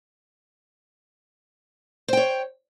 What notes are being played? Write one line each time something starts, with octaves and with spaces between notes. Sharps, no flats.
C5 C#5 G5